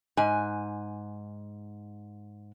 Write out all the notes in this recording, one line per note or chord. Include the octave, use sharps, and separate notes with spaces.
G#2 G#5